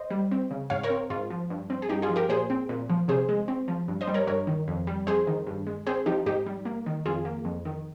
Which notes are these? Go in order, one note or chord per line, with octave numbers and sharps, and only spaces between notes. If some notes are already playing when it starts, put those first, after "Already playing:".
Already playing: C5 D#5
G3
C4
C#3
G#2 C#5 F5
A#4 C#5
C4
G#2 F4
F3
G2
C4
G#4
G2 D#4 G4
F4 G#4
F3
G4 A#4
A#2 G#4 C5
C4
A#2
F3
C3 G#4 C5
G#3
C4
F3
G2
C5 D#5
G3
A#4 C#5
G2 A#4 C#5
D#3
F2
G3
F2 G#4 C5
D#3
G2
G#3
C4 G#4 C5
F3 D#4 G4
G#2 D#4 G4
G3
A#3
D#3
F2 F4 G#4
A#3
F2
D#3